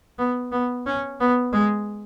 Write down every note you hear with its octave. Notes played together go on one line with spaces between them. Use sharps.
B3
B3
C#4
B3
G#3